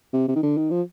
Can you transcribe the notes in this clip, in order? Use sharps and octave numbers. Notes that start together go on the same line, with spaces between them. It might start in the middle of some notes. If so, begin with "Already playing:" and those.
C3
C3
D#3
D3
D#3
F3